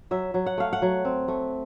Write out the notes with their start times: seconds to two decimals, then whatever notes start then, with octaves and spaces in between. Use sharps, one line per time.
0.11 F#3 E5
0.34 F#3
0.46 F#5
0.58 A3 F5
0.73 F#5
0.82 F#3
1.05 C4
1.28 A3